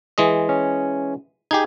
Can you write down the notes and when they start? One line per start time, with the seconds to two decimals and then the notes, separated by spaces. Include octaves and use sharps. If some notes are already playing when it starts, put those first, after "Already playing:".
0.18 E3 G#3 D#5
0.49 C#4
1.51 D#4 G4 G#4 G#6